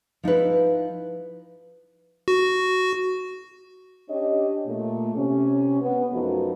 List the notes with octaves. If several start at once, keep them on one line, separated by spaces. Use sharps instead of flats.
F3 D#4 E4 B4
F#4
C#4 D4 G4 C#5 D#5
A#2 A3
C3 C#4
B3
F#2 F3 A3 B3 D#4 F#4